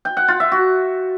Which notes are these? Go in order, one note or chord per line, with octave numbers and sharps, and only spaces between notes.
G5
F#5
F4
E5
F#4